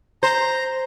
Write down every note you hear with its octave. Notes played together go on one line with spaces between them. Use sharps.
C5 A#5